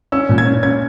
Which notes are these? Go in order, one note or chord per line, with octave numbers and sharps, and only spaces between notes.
C#4 E6
A#2
G#6
C#4
C#4 G#6